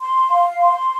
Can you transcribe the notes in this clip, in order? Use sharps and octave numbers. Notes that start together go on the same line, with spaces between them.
C6
F5
C6